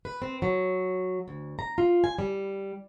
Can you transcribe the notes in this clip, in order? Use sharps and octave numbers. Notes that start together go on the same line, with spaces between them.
B4
C4
F#3
D2
A#5
F4
G#5
G3